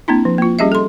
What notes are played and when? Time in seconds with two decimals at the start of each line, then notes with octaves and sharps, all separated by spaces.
0.08 A#3 C4 D4 E4
0.25 F3
0.38 A#3 F4
0.59 G3 C#4 G4 G#4 D#5 E5
0.72 A4 C6